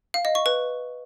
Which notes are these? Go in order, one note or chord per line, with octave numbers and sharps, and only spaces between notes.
F5
D#5
C#6
B4